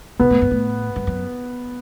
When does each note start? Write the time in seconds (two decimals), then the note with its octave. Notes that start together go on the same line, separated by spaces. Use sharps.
0.19 B2 B3
0.30 A2
0.42 G2
0.51 A2
0.96 G2
1.07 F#2